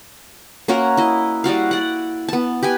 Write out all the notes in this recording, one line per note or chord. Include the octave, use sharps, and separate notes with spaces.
A#3 C#4 F#4 A#4
E4 D#5
G3 E4 F#4 F5
D5 F#5
B3 A5
G4 B4 G#5